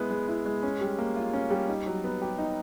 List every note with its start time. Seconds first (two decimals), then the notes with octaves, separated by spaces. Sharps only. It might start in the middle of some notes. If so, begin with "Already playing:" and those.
Already playing: G#3 B3 E4
0.10 G#3
0.28 E4
0.46 G#3
0.63 C#4
0.81 G3
0.98 A#3
1.16 F4
1.33 C#4
1.50 G3
1.68 D#4
1.86 F#3
2.04 B3
2.22 G4
2.38 D#4